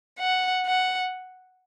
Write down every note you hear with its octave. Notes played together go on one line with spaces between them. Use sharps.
F#5
F#5